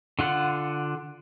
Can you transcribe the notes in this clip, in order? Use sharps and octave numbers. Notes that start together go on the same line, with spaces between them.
D3 F4 F#5